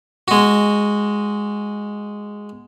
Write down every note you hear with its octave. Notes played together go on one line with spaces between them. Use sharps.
G#3 F#4